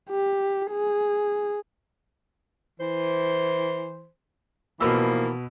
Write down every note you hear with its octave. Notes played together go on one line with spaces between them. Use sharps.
G4
G#4
E3 C5
B2 E3 F3 A#3 B5 E6